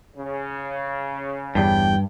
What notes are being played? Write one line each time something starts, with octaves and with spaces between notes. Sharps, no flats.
C#3
G1 E2 G2 G3 G5